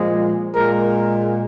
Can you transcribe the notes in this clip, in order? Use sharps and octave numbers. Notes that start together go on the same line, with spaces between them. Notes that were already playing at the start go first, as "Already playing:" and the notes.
Already playing: A#2 F3 G#3
A#2 G#3 A#4